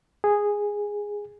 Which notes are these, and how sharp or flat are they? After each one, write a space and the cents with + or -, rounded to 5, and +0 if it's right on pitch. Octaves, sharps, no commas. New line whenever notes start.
G#4 -10